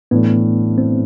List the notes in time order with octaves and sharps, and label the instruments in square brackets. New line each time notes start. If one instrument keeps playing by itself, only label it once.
[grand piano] A2 E3 A3 D4 [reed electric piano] B3
[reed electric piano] C4